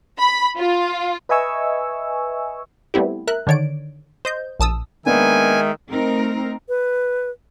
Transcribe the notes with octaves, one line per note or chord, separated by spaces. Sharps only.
B5
F4
B4 D#5 E5 G#5 C#6 E6
G3 A3 B3 C4 E4 G4
A#4 E5 F#6
D3 D#3 C#5 D5 D7
C5 D#5 G6
A#1 A5 D#6 E6
D#3 G#3 A#3 B3 D4 A#4 E5 G#5
A3 C4 D#4 A#4
B4